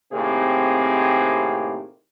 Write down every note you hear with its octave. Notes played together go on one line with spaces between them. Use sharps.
A2 C3 D#3 A#3 C4 G#4